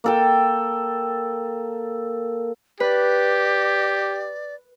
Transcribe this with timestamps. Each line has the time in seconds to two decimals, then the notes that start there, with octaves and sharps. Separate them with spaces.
0.04 A#3 A4 G5
2.80 G4 B4 D5